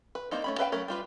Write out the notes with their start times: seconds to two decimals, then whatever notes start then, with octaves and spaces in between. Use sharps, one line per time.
0.15 B4
0.31 A#3 C4 D4 D#4
0.44 A3 C#4 B5
0.58 A4 B4 E5 F5 G5
0.72 F#3 A3 C#4 A#4
0.88 G3 F4 B4